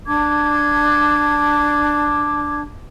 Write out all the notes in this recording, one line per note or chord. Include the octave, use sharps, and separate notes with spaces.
D4 A5 D6 G#6